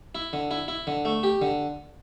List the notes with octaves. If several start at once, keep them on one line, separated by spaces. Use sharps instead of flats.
E4
D3
E4
E4
D3
A3
G4
D3